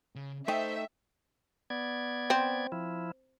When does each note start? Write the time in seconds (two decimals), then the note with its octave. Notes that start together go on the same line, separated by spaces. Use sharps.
0.15 C#3
0.48 A3 D#4 C5 E5 G5
1.70 B3 D5 G#6
2.30 C4
2.72 F3 E4